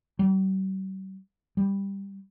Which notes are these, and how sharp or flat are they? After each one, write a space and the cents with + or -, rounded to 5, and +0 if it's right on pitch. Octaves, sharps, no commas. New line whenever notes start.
G3 -45
G3 +10